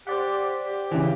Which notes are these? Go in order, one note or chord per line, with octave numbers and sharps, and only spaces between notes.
G4 C5 D5 F#5
G4
C#3 E3